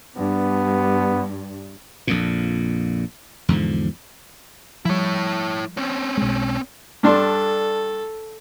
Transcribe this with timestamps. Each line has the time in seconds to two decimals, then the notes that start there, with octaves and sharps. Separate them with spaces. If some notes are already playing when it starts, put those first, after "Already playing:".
0.16 G2 B3
2.07 A#1 F2 A#2
3.48 E2 G#2 D3 F3
4.85 F3 G3 E4 C#5
5.77 C4 C#4
6.17 B1 G#3
7.03 G2 D4 A4 C6